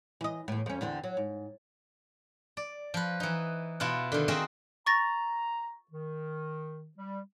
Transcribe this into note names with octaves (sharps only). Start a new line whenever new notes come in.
E3 D#5
E2 A2
F2 C#4
E2 D3 C4
F#3
G#2
D5
F3 B4
E3 D#4
B2 E4 F4 F#5
D3 D#3
C4 F#4 G#4 A#4 D#5 E5
A#5 C#6 A6 A#6
D#3
G3